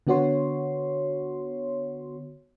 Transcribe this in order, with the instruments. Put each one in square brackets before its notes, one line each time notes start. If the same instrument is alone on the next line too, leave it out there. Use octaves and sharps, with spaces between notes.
[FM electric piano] D3 B3 F#4 C#5 C6